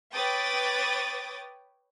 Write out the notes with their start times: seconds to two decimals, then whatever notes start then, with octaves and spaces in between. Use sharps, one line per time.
0.14 B4 C#5 G5 D6 D#6 A6